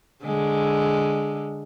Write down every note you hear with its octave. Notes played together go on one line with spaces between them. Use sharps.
D3 G#3